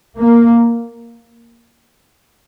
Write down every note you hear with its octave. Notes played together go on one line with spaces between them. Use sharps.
A#3